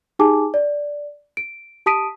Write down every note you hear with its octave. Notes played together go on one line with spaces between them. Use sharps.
D#4 G4 G#4 G#5 A5 D6
D5
D7
G4 A5 D#6 B6 D7 D#7